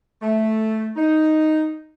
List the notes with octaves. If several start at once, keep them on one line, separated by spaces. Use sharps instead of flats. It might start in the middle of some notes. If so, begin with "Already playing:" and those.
A3
D#4